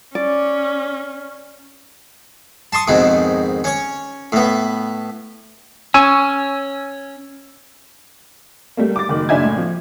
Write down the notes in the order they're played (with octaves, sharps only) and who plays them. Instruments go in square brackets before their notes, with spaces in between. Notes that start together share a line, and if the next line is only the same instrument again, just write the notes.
[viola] C#4 [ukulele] D5
[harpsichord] A5 C6 C#6 D#6
F2 G#2 B2 D#3
C#4 C#5
A2 B3
[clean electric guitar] C#4 [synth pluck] G#5 C#6 [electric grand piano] E6 D#7
[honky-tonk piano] G3 A3 A#3
D6 A6
F#1 D#3
F#1 D4 E5 G#5 G#6
A2
F3